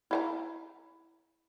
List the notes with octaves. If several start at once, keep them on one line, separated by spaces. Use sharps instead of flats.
E4 F5 A#5